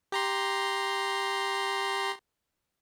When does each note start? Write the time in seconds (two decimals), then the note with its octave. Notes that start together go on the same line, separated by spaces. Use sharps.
0.12 G4 A#5 C6